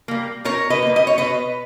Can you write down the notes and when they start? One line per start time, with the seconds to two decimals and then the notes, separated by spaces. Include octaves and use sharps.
0.08 G3 A#3
0.45 B2 A#4 C#5
0.70 B4 D#5
0.82 G3 A#3
0.96 D#5
1.07 C#5
1.18 B2 B4 D#5